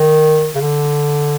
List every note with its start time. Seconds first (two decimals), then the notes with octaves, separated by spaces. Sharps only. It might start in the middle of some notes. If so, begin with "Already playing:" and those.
Already playing: D#3
0.55 C#3
0.61 D3